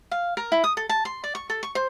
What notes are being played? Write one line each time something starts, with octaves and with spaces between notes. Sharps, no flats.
F5
A#4
E4
D#6
A4
A5
C6
D5
C#6
A4
C#6
C5